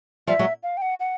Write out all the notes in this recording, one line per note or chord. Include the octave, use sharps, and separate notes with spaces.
F3 G3 E5
F#3 G#3
F5
G5
F#5
F#5